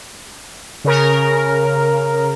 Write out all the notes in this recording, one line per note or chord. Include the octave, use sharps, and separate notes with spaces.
C#3 A#4